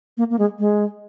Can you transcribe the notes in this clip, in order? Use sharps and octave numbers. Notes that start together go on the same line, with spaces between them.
A#3
A#3
G#3
G#3